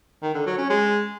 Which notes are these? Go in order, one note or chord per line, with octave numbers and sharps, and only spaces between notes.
D#3
D3
F#3
C#4
G#3